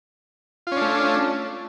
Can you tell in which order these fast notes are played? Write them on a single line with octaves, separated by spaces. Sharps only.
F4 C#4 D4 A3